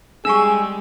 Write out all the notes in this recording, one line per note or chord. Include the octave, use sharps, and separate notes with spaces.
G3 G#3 D4 G#4 F5 C#6 E6